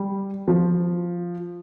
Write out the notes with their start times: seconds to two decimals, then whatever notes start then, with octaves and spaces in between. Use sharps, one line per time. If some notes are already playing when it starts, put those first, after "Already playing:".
Already playing: G3
0.48 F3